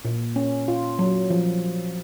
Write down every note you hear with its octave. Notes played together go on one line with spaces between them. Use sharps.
A#2
C#4
F4
F#3
F3